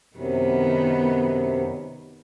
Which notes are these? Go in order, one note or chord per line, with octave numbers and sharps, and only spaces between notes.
F#2 C3 D#3 B3